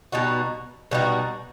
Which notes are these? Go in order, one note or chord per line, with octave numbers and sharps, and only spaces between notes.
B2 G3 D#4 F#4
B2 G3 D#4 F#4